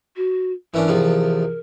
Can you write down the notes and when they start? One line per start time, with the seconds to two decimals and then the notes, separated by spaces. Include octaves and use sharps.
0.16 F#4
0.74 E3 C#4 D4 A#4
0.88 E2 C3 F3